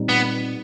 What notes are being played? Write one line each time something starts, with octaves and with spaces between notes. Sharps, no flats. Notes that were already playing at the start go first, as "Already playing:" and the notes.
Already playing: A#2 G3 C4 D#4
B3